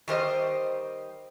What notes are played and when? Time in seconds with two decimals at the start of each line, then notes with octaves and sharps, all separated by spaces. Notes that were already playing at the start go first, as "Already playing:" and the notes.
0.08 D#3 G3 C5 D#5